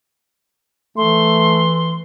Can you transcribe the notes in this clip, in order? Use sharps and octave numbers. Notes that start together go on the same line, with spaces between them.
E3 A3 C6